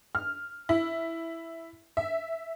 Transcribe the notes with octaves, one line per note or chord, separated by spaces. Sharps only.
F6
E4
E5